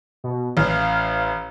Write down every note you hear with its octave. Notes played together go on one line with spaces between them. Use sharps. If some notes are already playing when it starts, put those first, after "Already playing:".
B2
A1 F5